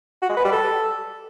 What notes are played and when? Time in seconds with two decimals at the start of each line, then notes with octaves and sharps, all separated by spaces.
0.22 F#4
0.30 G#3
0.37 B4
0.45 G3
0.52 A4